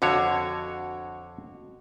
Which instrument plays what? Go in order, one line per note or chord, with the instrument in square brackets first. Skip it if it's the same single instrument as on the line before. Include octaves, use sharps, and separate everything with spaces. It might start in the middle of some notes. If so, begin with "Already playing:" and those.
[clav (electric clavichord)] F2 D3 C#5 [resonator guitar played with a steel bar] F#4